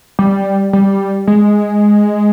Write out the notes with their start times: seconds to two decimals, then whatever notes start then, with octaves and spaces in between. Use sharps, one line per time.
0.19 G3
0.73 G3
1.27 G#3